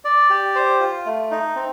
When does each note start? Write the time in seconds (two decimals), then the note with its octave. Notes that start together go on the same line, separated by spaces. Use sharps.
0.05 D5
0.30 G4
0.55 C5
0.80 F4
1.06 A3
1.31 D#4
1.56 C4